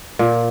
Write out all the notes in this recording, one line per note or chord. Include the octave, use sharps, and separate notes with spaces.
A#2